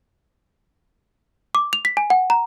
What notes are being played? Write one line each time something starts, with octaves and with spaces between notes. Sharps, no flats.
D6
F7
B6
G#5
F#5
A#5